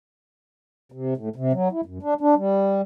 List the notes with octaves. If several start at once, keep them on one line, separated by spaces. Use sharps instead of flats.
C3
A2
C3
F#3
E4
F#2
D4
D4
G3